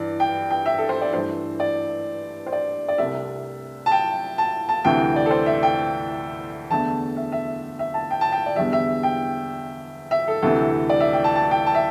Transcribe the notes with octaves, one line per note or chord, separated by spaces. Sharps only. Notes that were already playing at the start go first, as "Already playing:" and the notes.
Already playing: G2 E3 D5
G5
G5
E5
A4
C5
D5
G2 E3 A3 C5
D5
C5
D5
D5
C2 C3 A3 E5
A5
G5
A5
A5
D2 C3 E3 A3 G5
D5
A4
C5
E5
G5
E2 D3 A3 A5
E5
E5
E5
A5
G5
A5
G5
D5
E2 D3 G3 E5
E5
G5
E5
A4
D2 C3 E3 A3 A4
D5
E5
G5
A5
A5
G5
A5
E5